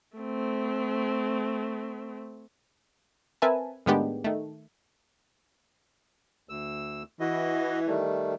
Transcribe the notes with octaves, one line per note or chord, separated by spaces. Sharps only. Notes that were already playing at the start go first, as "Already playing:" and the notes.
A3 C4
C4 A#4 B4 E5 G#5 A5
A2 D#3 G#3 B3 D4 G4
D#3 A3
D2 E6
E3 F#4 D#5
D#3 G3 A3